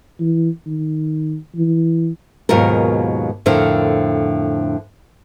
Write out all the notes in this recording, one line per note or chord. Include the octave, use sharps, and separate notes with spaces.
E3
D#3
E3
D#2 G#2 B2 F#3 F4 A#4
F2 A2 D3 A#4 C5